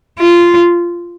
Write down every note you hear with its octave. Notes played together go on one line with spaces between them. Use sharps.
F4